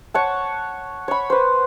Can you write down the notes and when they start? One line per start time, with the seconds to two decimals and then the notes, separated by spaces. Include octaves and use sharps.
0.14 C#5 F#5 A5
1.08 C#5 B5
1.30 B4 C5